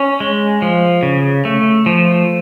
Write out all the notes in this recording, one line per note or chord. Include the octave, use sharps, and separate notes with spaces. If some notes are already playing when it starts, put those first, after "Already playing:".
Already playing: C#4
G#3
F3
C#3
A3
F3